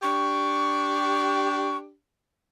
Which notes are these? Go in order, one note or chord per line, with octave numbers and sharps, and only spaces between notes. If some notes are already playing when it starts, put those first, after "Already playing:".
D4 G4 C#6